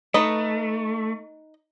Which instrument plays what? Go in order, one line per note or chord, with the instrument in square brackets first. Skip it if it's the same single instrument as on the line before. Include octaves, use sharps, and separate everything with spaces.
[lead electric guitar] A3 [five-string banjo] D#4 B4 D#5